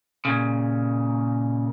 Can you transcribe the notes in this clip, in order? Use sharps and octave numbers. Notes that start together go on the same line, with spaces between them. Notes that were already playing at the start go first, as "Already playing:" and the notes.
A#2 C#3